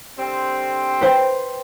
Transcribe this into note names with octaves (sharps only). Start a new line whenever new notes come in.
D3 G3 C4
B4 C5 G5